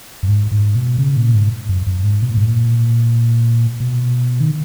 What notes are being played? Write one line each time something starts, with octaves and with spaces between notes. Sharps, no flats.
F#2
G#2
G#2
B2
C#3
A#2
G#2
F#2
F#2
G#2
B2
A#2
G#2
A#2
B2
D#3